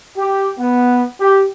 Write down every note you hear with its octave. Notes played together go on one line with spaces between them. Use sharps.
G4
B3
G4